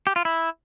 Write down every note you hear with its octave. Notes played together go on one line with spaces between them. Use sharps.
G4
F4
E4